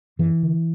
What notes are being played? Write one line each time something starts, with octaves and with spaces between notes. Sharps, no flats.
F#2 E3
D3